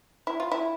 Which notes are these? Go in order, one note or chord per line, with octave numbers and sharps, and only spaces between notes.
E4
F4
E4